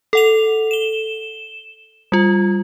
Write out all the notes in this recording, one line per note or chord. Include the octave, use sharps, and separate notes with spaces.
A4 F#5 F7
E7 G7
G3 F4